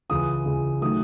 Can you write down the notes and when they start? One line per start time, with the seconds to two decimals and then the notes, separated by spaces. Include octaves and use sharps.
0.09 C#2 C#3 E3 G#3 D#6
0.45 C#2 C#3 E3 G#3
0.81 D#3 F#3 A3 D#6